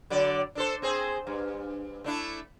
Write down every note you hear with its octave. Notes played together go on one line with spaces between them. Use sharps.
D3 F#3 D5
D4 A4 C5
C4 G#4 C5
G2
A3 D4 E4